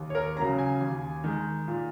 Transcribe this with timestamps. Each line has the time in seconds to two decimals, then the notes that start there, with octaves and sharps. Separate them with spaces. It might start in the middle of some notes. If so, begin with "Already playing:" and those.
Already playing: D#2
0.10 C#5
0.15 A#4
0.36 C#4 A#5
0.39 C#3 F#3
0.59 G#5
0.80 D#2
1.24 D#3 G#3
1.68 A#2